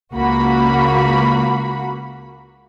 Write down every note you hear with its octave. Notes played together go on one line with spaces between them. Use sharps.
C#2 A#3 F#4 B5